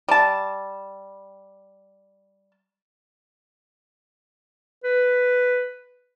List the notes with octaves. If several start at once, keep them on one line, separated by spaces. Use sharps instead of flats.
G3 A5
B4